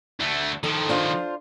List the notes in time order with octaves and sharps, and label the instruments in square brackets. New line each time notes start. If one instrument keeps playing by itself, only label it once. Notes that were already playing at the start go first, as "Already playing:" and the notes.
[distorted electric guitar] D2 A3
[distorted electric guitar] D#3 F3 [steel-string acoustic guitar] A4
[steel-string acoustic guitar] D4 F4 C5